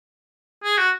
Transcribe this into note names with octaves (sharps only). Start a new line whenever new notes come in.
G#4
F#4